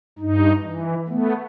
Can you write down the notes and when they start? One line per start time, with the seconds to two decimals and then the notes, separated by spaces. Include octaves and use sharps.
0.19 G2 D#4
0.63 E3
1.08 A3 B3